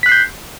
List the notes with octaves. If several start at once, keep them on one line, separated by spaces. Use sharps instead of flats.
F#6 G6 B6 C7